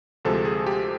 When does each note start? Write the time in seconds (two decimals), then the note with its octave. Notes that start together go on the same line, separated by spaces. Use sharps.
0.25 D2 C3 F3 G#3 A4
0.45 G#4
0.66 G4